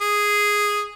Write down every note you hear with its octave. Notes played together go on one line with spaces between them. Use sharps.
G#4